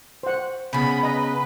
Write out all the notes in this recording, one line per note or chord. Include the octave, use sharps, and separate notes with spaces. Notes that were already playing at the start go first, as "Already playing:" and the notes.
C5 F#5
C#3 B3 B5
B4 D#5 A#5